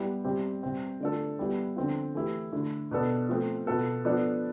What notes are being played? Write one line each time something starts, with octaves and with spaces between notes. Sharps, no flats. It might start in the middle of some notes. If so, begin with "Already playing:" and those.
Already playing: G3 B3 E4 G4
C3 G3 C4 G4
C3 G3 C4
D3 A3 D4 F4 A4
G3 B3 E4 G4
D3 F3 C4 F4
E3 A3 E4 G4
D3 A3 E4
B2 B3 D4 A4
F3 A3 C4
B2 B3 F4 A4
F3 B3 D4 A4